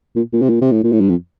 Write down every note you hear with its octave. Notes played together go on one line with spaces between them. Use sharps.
A#2
A#2
C3
A#2
C3
A2
A#2
A2
G2
F2